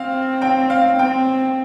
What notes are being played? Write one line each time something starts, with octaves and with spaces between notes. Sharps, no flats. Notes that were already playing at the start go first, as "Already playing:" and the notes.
Already playing: C4 F5
G5
F5
C4 G5